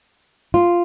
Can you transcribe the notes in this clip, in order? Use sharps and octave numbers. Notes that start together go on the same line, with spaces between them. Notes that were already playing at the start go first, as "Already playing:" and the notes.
F4